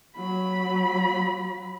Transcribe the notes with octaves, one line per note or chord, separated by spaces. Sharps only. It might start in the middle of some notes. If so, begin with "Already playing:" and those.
F#3 B5